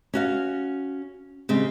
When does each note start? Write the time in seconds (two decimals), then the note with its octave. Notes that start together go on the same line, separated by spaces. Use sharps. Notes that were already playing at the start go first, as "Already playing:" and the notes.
0.14 C#4 F#4 F5
1.49 C#3 G3 G#3 C4